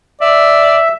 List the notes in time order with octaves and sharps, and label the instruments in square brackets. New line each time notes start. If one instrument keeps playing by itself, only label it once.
[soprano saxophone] D5 [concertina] E5